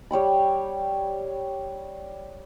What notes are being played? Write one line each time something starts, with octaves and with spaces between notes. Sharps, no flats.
G3 C#5 G5 B5